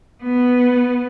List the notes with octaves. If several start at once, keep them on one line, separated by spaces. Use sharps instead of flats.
B3